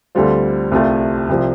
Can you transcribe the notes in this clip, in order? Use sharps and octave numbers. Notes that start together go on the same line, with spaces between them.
D2 D3 G3 C4 F4
C2 C3 A3 F4
C2 C3 F3